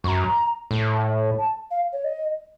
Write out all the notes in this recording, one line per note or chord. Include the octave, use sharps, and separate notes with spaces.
F#2 A#5 C#6
A2
A5
F5
C#5
D#5